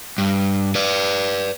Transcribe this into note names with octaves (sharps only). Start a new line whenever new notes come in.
G2
B4 D5